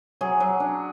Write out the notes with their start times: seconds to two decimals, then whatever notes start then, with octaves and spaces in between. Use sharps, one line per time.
0.21 F#3 G#4
0.40 F#3
0.60 D4